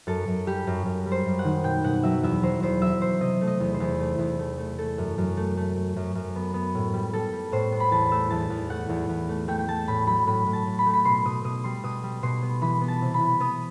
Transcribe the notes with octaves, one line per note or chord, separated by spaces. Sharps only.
F#2 A4
F#2
G3 G4
F#2
F#2
G3
C5
F#2
F#5
D#3
B2 G5
B2 F#5
F#3 E5
E2 E5
F#3 C5
E2 C5
F#3 E5
B2 C5
C3 D#5
A3
D#5
E2
C5
E2
A3
E2
A3
A3
A3 A4
F#2
F#2
A3
A3
A3
F#2
F#2
B3
B3
A2
G3
G3 A4
G3
A2 C5
B3
B5
E2 A5
A3 E6
E2 A5
E2
A3 F#5
E2
E2
A3
A3 G5
G5
A3 A5
A2 B5
F#3 B5
A2 B5
A2
A5
A2
B5
A3
B5
B2 C6
B2 D#6
B2 D#6
G3 C6
B2 D#6
G3
B2 C6
B3
E3 B5
B3
A5
C3
B5
E3
B3 D#6